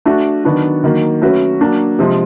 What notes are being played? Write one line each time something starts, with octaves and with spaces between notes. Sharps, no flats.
A3 D4 F#4
D#3 F#3 B3 D4 F#4
D#3 F#3 A#3
F#3 A3 C#4 F#4 B4
F#3 A#3 D4
C3 F3 G#3